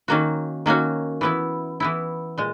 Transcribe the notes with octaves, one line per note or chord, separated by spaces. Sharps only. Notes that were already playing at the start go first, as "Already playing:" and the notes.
D#3 A#3 C#4 F#4
D#3 A#3 C#4 F#4
E3 B3 E4
E3 B3 E4
A#2 G#3